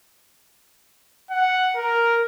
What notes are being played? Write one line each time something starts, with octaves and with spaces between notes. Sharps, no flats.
F#5
A#4